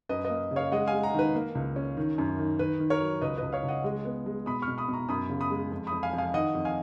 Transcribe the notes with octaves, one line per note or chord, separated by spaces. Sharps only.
F#2 B4 D#5
B4 D#5
A#3
C#3
C#5 F5
G#3 D#5 F#5
F5 G#5
G#3
F#5 A#5
D#3 B4
A#3
C#2
C#4
D#3
F#2
D#3
D#3 B4
D#3
A#4 C#5
F#3
C#2 B4 D#5
C#2 B4 D#5
C#5 F5
C#2
D#5 F#5
G#3
B3
G#3
B2 B5 D#6
C#6 F6
B2
B5 D#6
B2
A#5 C#6
F#2 B5 D#6
C#3
B5 D#6
G#3
F2
B5 D#6
F2
F5 G#5
F2
F5 G#5
D#3 D#5 F#5
F2
F5 G#5